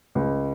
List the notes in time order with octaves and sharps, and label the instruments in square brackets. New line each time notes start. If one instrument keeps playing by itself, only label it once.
[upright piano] C#2